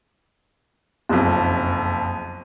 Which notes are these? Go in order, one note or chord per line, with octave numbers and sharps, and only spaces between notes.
F#1 B1 F2